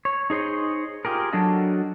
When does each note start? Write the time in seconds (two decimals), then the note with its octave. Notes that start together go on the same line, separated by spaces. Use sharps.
0.05 C#5
0.30 D#4 G#4 C5 C#5 D#5
1.05 F4 G4 G#4 A#4
1.33 F#3 D4 F#4 A4 D#5